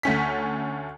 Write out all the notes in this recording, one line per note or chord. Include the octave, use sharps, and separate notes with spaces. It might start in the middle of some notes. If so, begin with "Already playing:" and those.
D2 A3 C#4 B6